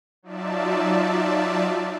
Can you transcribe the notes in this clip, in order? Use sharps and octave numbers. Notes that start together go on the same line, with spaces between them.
F#3 D#4 F4 D5 E5 A5